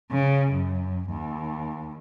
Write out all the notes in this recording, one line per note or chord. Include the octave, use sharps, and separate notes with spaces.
C#3
F#2
D#2